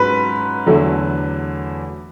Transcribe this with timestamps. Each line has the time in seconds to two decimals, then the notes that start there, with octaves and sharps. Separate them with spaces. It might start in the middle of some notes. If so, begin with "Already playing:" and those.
Already playing: G#2 F#3 C#4 B4
0.66 E2 D3 F#3 A3